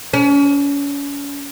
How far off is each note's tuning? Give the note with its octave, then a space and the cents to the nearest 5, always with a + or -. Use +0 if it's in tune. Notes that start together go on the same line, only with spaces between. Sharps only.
C#4 +35